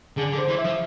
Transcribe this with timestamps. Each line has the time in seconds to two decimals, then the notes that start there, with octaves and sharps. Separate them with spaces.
0.17 D3 G#4
0.32 D3
0.38 C5
0.48 E3
0.58 E5
0.64 F3